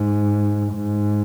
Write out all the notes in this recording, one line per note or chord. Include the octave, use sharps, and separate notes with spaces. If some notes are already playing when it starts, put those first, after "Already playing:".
Already playing: G#2
G#2